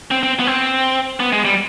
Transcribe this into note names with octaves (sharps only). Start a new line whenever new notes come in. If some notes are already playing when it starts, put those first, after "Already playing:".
C4
C4
B3
C4
B3
G#3
G3